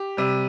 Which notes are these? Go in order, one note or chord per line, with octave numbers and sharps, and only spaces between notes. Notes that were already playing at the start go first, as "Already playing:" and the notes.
Already playing: G4
C3 G3